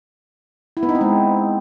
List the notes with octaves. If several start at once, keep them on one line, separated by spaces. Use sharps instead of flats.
E4
B3
D#4
C4
G#3